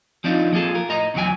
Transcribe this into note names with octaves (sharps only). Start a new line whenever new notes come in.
F3 C4 D4 D#4 F4
F3 A#3 F4 G#4 A4
F4 A#4
A2 D#5 A#5
E2 C#3 E3 F#3 G5 G#5